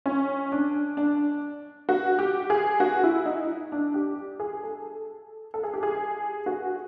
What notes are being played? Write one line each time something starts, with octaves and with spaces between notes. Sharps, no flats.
C#4
D4
D4
F#4
G4
G#4
F#4
E4
D#4
D4
G4
G#4
A4
A4
G#4
G4
G#4
F#4